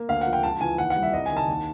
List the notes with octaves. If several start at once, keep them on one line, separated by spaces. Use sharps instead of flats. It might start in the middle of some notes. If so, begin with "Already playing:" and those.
Already playing: A#3
D2 F5
F#5
F3
G5
C#2 A5
E3 G#5
D#2 F#5
F#5
G3
E5
C2 D#5
G#5
D#3
A5
D#2